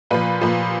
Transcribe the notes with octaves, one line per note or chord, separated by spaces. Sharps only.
A#2 F3 B4
A#2 F3